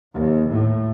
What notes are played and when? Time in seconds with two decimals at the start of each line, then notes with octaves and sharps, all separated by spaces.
0.13 D#2
0.50 A2